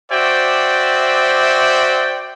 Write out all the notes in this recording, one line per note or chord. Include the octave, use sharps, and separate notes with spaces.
F#4 C5 D5 E5 G5